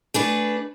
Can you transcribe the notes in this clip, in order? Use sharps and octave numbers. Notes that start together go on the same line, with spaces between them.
A3 D4 G#4 B4